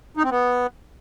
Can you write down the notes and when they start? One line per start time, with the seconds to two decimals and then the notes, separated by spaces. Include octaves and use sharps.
0.17 D#4
0.24 C4
0.31 B3